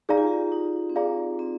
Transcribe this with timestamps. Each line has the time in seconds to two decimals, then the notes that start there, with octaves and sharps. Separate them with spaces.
0.09 D#4 G4 G#4 D5 F5 A#5
0.17 F4
0.27 G4
0.52 D#4
0.90 C4
0.95 D4 D#4 G#4 D5 F5 A#5
1.39 C4